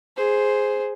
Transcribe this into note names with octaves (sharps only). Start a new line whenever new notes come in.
G#4 C5